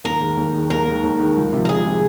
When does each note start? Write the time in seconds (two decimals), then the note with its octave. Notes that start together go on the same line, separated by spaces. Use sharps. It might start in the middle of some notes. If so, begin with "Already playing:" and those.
0.04 D#2 A#4
0.21 D#3 G#3
0.37 D#2
0.54 D#3 G#3
0.70 D#2 A#4
0.87 D#3 G#3
1.04 D#2
1.20 D#3 G#3
1.37 C#2
1.53 C3 F3
1.65 A#4
1.69 C#2 G#4
1.86 C3 F3